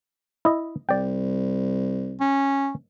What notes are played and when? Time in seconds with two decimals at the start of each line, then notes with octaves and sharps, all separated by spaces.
0.45 E4 D#5
0.89 C2 D5 G5
2.21 C#4